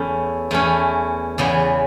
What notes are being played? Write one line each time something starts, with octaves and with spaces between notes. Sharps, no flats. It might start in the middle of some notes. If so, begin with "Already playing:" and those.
Already playing: E2 E3 A3 C#4
E2 E3 A3 C#4
E2 C#3 E3 B3